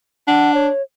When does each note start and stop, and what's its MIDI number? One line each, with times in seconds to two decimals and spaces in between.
0.27 0.68 62
0.27 0.51 78
0.54 0.82 73